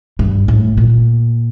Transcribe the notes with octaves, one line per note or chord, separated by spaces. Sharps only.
G2
A2
A#2